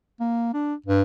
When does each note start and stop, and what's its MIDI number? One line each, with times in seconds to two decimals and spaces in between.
0.20 0.50 58
0.54 0.74 62
0.86 1.02 43